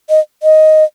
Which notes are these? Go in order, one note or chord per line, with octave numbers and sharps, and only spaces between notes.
D#5
D#5